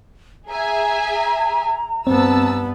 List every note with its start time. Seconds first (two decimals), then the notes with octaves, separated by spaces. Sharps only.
0.48 G#4 E5 G#5 A#5
2.07 G2 B3 C4 A5 E6